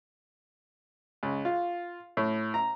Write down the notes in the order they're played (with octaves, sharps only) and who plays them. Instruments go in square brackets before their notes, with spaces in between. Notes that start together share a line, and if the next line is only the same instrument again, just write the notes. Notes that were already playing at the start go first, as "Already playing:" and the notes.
[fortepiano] C#2
F4
A2
A#5